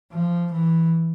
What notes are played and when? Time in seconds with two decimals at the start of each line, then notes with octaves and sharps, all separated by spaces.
0.13 F3
0.52 E3